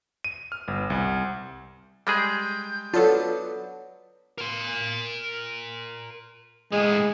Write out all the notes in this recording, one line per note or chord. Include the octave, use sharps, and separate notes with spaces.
D#7
F6
G1
C2
G3 G#3 G#4 G6
F#3 B3 D4 F4 A4
A#4 C6
A2 G#3 G#4